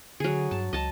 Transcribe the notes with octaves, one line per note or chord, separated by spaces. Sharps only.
D3 F#3 G#4
G2 A5
C#2 D#5 A5